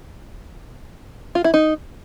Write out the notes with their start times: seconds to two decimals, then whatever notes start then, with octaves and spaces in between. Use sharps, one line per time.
1.35 F4
1.44 E4
1.54 D#4